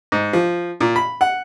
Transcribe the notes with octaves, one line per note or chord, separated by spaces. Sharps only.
G#2
F3
A#2
B5
F#5